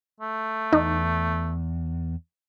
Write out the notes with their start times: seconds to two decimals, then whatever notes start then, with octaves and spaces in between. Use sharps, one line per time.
0.20 A3
0.73 E2 D#4